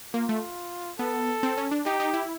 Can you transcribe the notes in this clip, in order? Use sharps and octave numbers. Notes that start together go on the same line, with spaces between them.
A#3 F4
A3
B3 A4
C4
C#4
D4
D#4 G4
D#4
E4